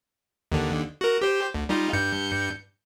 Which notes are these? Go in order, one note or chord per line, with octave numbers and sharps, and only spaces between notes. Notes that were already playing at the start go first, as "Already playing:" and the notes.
D#2 D3
F#4 A#4
G4 C5
D2
G3 D#4 F4
G2 G6 C#7